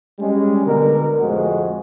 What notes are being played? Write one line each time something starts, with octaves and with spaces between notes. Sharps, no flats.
G3 G#3 C#4
B2 D3 A#4
F2 A2 G#3 F#4 G#4 C5